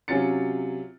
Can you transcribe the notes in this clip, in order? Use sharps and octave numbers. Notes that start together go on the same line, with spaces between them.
C3 F#3 C#4 F4 A6 C#7